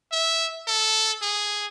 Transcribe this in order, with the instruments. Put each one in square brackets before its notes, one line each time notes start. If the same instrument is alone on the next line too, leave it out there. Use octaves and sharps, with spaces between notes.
[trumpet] E5
A4
G#4